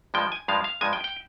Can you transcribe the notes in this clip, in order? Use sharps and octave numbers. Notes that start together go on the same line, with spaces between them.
G2 F3 G#3 G5
G#5
G2 F3 G#3 F5
F5
G2 F3 G#3 G#5
G5
G5